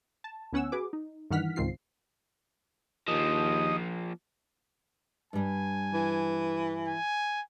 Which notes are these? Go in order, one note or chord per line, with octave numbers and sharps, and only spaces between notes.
A5
D2 B3 C#4 F#5 G#5 E6
F#4 G#4 B4 D6
D#4
G2 D#3 E3 F#5 F6 B6
C#2 G#2 D#3 C4 F4 C7
D#2 F3 A#3 D#5
G2 G3 G#5
E3
G#5